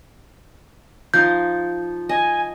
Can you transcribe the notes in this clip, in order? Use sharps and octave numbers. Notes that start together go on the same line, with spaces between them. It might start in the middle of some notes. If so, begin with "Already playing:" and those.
F3 D#4 G6
D#5 G#5